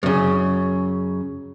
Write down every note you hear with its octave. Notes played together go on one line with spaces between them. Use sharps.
F#2 C#3